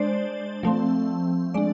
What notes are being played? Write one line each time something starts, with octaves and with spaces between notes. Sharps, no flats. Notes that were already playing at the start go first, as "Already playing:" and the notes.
Already playing: G#3 D4 C5 D5
F3 A3 C4
G#3 D4 D5